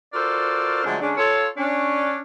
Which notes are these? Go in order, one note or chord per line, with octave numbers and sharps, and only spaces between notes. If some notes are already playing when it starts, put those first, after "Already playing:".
F4 F#4 A4 A#4 C5 D5
D3 F3 F#3 G#3 A3 D4
D3 G#3 C#4 D4
F4 A4 C#5
C#4 D4